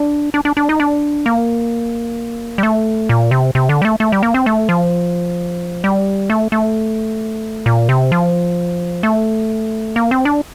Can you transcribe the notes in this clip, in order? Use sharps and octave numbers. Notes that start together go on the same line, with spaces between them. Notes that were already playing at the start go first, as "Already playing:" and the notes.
Already playing: D4
D4
D4
D4
D#4
D4
A#3
G3
A3
A#2
C3
C3
D3
G3
A3
A3
G3
A#3
C4
A3
F3
G3
A3
A3
A#2
C3
F3
A3
A#3
C4
D4